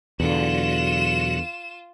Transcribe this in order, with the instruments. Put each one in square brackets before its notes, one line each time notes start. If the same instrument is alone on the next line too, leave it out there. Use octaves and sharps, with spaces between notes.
[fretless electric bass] E2 D3 [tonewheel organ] B2 F#3 F#4 [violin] F4 E7